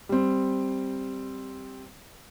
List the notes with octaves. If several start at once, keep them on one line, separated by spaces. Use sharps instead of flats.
G3 C4